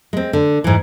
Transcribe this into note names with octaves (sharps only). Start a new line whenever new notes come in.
G#3 C4
D3
G#2 E3